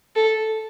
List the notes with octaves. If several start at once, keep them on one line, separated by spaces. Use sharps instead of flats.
A4